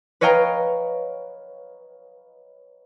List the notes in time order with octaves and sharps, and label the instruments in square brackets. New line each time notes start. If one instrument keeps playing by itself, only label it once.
[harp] B4 C#5 D#5 F5 G5 A#5